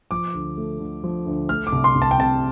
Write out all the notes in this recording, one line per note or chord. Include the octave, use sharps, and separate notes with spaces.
F3 D6
D2
A3
D3
F3
D2
A3 F6
D6
C2
C6
C2
A5
G5
C3 A5